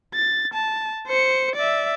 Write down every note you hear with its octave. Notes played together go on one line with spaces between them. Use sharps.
A6
A5
C5 C#7
D5 E5